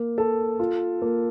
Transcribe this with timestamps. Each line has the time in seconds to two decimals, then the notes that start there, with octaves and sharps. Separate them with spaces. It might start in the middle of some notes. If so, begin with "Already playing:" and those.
Already playing: A#3
0.18 A4
0.59 F4
1.02 A#3